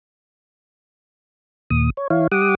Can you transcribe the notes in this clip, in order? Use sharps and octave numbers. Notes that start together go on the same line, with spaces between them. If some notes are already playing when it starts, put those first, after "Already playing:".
D#2 A#2 D#6
C#5
E3 E4 C#5 F5
G3 G4 F#5 D6 D#6